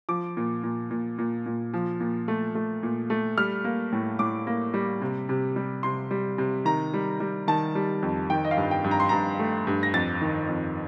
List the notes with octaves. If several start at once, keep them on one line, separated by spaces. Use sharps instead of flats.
F3 D6
A#2
A#2
A#2
A#2
A#2
F3
A#2
A3
A3
A#2
A3
G3 F6
A#3
A2
A2 D6
A#3
G3
C3
C3
G3
C3 C6
G3
C3
D#3 A#5
G3
G3
D#3 A5
G3
F2
D#3 G5
D#5
F5
G2
G5
G2
A#5
C6
G2 A#5
A3
G2
A#6
F2 A6
D#3
F2